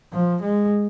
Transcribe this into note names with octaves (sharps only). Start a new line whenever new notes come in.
F3
G#3